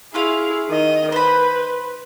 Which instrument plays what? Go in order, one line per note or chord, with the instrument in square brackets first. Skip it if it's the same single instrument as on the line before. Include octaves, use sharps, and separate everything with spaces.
[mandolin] C#4 F4 F5 [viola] E4 G#4
[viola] D#3 D#5
[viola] B4 [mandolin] C5 B5